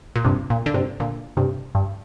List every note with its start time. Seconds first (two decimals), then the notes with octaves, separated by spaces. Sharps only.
0.16 A#2
0.25 G2 C3
0.50 A#2
0.66 D3
0.74 G2 C3
1.00 A#2 D3
1.37 G2 C3
1.75 G2